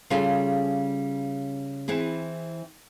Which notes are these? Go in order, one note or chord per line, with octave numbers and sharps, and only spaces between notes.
C#3 G3 C#4 F4 G#4 A4
E3 C4 E4 G#4